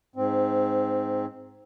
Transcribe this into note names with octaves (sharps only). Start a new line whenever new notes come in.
G#2 C4